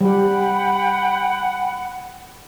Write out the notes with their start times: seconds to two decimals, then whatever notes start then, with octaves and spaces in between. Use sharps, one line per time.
0.01 G3 G4 F#5 G5 B5